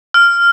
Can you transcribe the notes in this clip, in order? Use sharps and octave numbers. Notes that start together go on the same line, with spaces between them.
F6